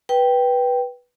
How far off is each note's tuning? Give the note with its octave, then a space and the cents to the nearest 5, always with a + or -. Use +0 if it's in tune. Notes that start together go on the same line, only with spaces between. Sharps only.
B4 -10 G5 +0